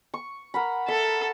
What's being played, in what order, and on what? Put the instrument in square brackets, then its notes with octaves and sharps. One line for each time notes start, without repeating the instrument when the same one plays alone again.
[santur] C#6
A#4 F#5 B5
[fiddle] A4 [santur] E5